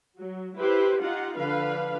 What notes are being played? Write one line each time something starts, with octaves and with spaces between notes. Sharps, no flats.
F#3
E4 G4 B4 C5
D#4 F4 G4 F#5
D3 F3 B4 F5